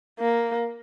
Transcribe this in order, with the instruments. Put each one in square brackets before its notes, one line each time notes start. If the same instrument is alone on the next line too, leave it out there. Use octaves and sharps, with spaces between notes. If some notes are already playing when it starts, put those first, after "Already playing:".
[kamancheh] A#3